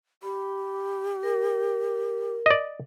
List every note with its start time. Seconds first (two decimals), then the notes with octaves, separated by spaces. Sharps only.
0.23 G4 B5
1.23 A#4
2.46 D5 D#5